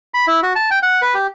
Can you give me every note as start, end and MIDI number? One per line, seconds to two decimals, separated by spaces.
0.14 0.26 83
0.27 0.40 64
0.43 0.53 66
0.55 0.70 81
0.71 0.79 79
0.83 1.01 78
1.02 1.14 71
1.14 1.27 67